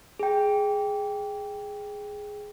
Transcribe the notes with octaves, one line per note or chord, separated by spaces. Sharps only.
G#4 G5